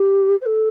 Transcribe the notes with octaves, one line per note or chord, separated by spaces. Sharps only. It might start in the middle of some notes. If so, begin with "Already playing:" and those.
Already playing: G4
C5
A4